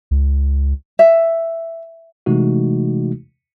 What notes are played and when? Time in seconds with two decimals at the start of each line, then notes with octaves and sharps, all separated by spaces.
0.11 C#2
0.99 E5
2.26 C3 E3 G#3 A3 D#4 F#4